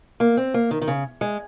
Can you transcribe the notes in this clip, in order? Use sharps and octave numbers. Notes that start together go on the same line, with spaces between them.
A#3
C4
A#3
D#3
D#3
C#3
G#3